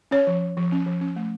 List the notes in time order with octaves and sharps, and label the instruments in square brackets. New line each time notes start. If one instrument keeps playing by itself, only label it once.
[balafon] C#4 C#5
F3
F3
F3
C#4
F3
C#4
A3